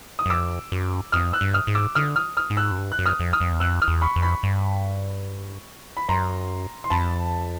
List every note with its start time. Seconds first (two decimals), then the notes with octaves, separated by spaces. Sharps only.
0.19 D#6
0.26 F#2
0.30 F2 D6 E6
0.72 F#2
1.12 F2 D#6 F6
1.33 E6 F#6
1.41 G2
1.54 D#6 F6
1.67 G#2
1.75 D6 E6
1.95 D3 D#6 F6
2.16 D#6 F6
2.37 D#6 F6
2.50 G#2
2.57 E6 F#6
2.71 F#2
2.78 G2
2.92 F#6
2.99 F#2
3.06 D#6 F6
3.20 F2
3.33 D#6 F6
3.41 F2
3.52 E2
3.60 F2 E6 F#6
3.82 D#6 F6
3.88 E2
4.02 B5 C#6
4.16 F2
4.22 B5 C#6
4.43 G2
5.97 B5
6.08 F#2 A#5 C6
6.84 C6
6.90 F2 A5 B5